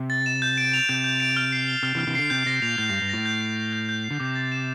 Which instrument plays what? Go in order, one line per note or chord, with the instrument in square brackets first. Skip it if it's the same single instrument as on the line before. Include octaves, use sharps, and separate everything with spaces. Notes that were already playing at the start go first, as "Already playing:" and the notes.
Already playing: [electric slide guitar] C3
[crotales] A6
E7
G6
D7
F7
[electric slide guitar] C3 [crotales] G6
[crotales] G6
D7
F6
C7
G7
[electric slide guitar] C3 [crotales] F6
[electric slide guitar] C3 E3
[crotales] F6
[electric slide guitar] C3 E3
[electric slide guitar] D3 [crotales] C7
[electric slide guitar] C3 [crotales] G6
[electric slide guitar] C3 [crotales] A#6
[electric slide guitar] A#2 [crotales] F7
[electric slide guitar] A2 [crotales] G6
[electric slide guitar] G2
[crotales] G6
[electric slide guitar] G2
[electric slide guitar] A2 [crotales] A#6
[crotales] G6
C7
G7
G6
G6
C7
[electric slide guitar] D3
[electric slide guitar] C3 [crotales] D6
[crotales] A6
E7